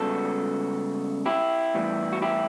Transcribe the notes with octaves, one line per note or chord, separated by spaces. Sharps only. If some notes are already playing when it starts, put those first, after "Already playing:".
Already playing: C#2 C#3 G3 B3 F#4 A4
E4 G4
A2 E3 G3 B3
F#4
E4 G4